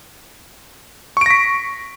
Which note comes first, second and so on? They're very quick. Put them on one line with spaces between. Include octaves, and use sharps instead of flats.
C#6 D7 A#6 B6